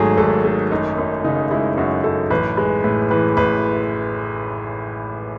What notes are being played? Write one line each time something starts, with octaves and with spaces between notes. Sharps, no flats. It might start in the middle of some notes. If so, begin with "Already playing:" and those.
Already playing: G#1 G#2 F#3 A3 G#4 A4
G#1 A4
A3 G#4
F#2 D#4
F#2
C#3 D#4
G#3 E4
F#2 F#4
F#2 A4
A1 B4
G#3 B4
A2 B4
E3 B4
A1 B4